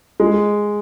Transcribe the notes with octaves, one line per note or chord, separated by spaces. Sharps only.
G#3